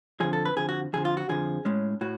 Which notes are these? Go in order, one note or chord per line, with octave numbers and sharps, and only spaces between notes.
F2 D3 F3 G#4
A4
B4
F2 D3 F3 G#4
F#4
F2 D3 F3 G#4
F4
F#4
F2 D3 F3 G#4
A2 G#3 C#4
A2 F#4